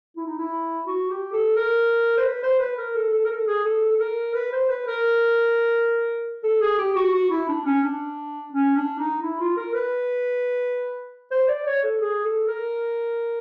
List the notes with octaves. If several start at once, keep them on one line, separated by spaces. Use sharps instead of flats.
E4
D#4
E4
F#4
G4
A4
A#4
C5
B4
C5
B4
A#4
A4
A4
A#4
A4
G#4
A4
A4
A#4
B4
C5
B4
A#4
A4
G#4
G4
F#4
F#4
E4
D4
C#4
D4
C#4
D4
D#4
E4
F4
A#4
B4
C5
D5
C#5
A4
G#4
A4
A#4